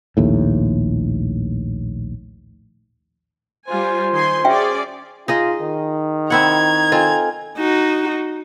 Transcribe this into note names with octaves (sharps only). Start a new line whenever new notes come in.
A#1 D#2 A2
G3 F4 C5 G#5
D#3 G#5 C6
C#4 F#4 G#4 D5 E5 G5
D#4 F4 G#4 D#5
D#3
C4 E4 F#5 A#5 G#6
C4 F4 A4 D#5 G#5
D#4 F#4